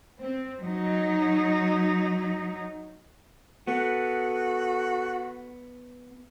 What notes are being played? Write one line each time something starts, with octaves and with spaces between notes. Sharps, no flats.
C4
F#3 D#4
B3 F#4 A4